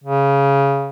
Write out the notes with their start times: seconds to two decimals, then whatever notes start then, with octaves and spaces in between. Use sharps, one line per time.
0.04 C#3